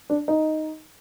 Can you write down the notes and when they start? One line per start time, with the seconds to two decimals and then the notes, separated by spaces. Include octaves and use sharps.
0.10 D4
0.28 D#4